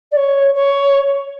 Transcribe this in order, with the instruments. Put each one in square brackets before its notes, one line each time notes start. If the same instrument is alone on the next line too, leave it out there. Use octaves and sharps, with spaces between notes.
[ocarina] D5
C#5
C#5